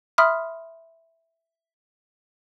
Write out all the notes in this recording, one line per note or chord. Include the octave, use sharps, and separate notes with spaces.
E5 B5 C6 D#6 F6